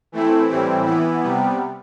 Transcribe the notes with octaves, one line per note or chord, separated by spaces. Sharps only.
E3 A3 C4 E4
A2 E3 G3 C4 E4
E3 B3 E4
C3 G3 B3